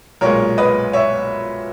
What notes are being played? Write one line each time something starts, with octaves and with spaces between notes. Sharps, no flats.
B1 A#2 G#3 A#4 C#5
B4 D#5
C#5 E5